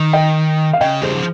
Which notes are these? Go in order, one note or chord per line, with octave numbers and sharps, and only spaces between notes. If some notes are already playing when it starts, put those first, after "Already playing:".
Already playing: D#3
D#5 G5
F5
C#3 D#5 G5
G3 G#4 C5
F3